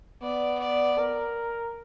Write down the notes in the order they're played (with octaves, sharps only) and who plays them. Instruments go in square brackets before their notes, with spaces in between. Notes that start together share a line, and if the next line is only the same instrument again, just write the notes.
[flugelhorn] B3 [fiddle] D5
[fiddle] D5
[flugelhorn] A#4